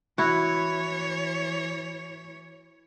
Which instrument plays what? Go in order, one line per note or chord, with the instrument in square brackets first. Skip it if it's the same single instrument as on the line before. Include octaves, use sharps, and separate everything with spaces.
[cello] E3 C#5 [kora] E4 F#4